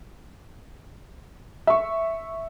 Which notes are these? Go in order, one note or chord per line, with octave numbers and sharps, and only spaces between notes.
E5 C#6